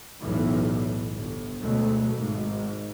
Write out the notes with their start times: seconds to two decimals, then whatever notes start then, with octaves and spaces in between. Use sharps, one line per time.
0.21 B1 E2 A2 E3
1.13 G1
1.62 D2 B2 F#3 G#3 A3
2.13 G#1 G#2